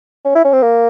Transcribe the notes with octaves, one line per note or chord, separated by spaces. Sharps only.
C#4
E4
C#4
C4
A#3